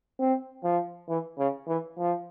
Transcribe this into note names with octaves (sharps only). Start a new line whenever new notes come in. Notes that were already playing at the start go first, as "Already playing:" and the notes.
C4
F3
E3
C#3
E3
F3